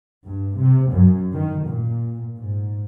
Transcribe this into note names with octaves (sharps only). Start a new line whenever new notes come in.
G2
C3
F#2
D#3
A#2
G#2